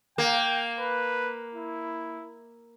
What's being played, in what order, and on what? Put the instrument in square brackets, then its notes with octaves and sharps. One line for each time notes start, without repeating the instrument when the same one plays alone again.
[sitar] A#3 [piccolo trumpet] G5
[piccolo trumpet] B4
E4